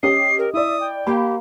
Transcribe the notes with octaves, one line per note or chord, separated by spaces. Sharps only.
C#4 G4 D#5 C7
A#4
E4 D5 E5 D#6
G5
A#3 G4 B5